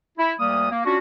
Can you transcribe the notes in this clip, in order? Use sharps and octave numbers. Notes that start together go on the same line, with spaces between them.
E4
D2 G3 A#3 D#6
A#3
C#4 D4 F4 F#4